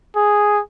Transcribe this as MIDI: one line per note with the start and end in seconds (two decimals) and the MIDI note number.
0.16 0.61 68